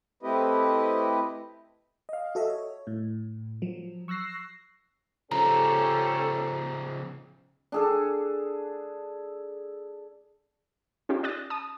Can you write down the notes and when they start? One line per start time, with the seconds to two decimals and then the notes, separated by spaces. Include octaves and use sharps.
0.23 A3 C4 E4 G4 B4 D#5
2.09 D#5 F5
2.35 F#4 A4 D#5 E5
2.50 C#5
2.87 A2
3.62 F3 F#3
4.08 C#6 E6 F#6 A#6 C7
5.32 C#3 F3 C#4 G4 A4 A#5
7.72 D4 G#4 A4
11.09 C#4 D#4 F4 G4
11.23 D5 D#6 F#6 A6
11.50 A5 D#6